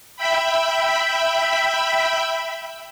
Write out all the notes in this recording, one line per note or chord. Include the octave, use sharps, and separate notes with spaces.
E5 G5 B5